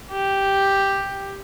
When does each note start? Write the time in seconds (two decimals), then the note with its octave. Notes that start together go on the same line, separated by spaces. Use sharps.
0.12 G4